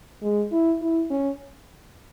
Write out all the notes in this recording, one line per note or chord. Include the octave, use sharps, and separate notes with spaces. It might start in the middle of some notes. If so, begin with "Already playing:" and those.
G#3
E4
E4
C#4